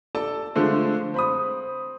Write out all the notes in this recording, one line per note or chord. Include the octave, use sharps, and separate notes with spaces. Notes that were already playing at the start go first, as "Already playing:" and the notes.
A4 D5 A5
D3 F3 G#3 A3 C4
C4 B5 D#6